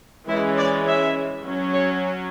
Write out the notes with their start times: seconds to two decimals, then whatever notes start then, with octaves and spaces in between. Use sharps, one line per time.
0.28 E3 G#3 C#4 E4
0.57 D5
0.87 E5
1.45 F#3 C#4
1.73 C#5